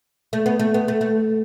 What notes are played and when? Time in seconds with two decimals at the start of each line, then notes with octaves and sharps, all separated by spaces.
0.33 A3
0.46 B3
0.59 A3
0.74 B3
0.88 A3
1.01 A3